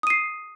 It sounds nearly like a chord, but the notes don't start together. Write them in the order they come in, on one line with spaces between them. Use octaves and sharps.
D#6 D#7 C7